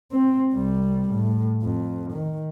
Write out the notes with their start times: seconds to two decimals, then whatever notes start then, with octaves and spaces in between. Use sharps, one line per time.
0.12 C4
0.54 C2 G3
1.10 A2
1.63 F2
2.12 D#3